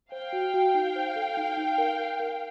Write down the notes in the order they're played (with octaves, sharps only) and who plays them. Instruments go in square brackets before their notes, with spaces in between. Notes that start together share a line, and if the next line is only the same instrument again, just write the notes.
[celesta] C5 [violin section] F5 G5
[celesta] F#4
F#4
D#4
C5
A4
D#4
D#4
A#4
A#4
A#4